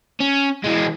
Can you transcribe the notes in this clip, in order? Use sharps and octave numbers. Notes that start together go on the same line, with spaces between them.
C#4
E3 G#3